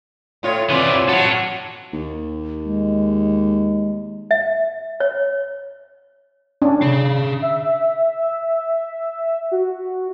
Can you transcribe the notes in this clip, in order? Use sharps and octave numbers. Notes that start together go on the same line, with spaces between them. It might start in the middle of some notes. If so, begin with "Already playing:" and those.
A2 F4 C#5
C3 E3 B3 F4 D5
F#3 F#4 A4 C#5
D#2
G#3
E5
C#5
C#4 D4
G#4 F5
E5
F#4